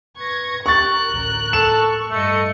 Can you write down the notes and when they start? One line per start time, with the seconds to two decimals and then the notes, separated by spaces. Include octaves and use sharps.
0.18 B4 C#6 G#6 A#6
0.66 G4 A#4 C#6 F#6 A6
1.07 A1 D2
1.53 A4 C#6 E7
2.11 G2 A3 A4 D#5 C#7